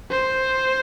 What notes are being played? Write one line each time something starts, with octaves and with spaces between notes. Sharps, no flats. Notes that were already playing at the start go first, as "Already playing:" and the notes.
C5